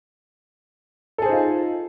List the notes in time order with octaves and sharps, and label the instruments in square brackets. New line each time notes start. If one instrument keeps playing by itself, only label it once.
[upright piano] A4
G#4
C5
D#4
F4